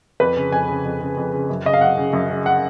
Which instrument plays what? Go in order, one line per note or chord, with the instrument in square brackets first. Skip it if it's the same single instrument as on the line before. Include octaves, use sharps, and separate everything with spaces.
[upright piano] F2 B4
C#3
F2 G#5
C#3
F2
C#3
F2
C#3
F#2
C#3 D#5
F5
F#2 F#5
C#3
F#2
C#3
F#5